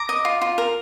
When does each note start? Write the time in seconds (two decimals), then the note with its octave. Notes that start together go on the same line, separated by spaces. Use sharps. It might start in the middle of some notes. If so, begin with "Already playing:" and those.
Already playing: A#5 D6
0.09 D#5
0.25 F4
0.41 F4
0.58 A#4